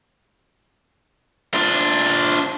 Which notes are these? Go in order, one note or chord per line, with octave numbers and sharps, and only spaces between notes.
D4 F4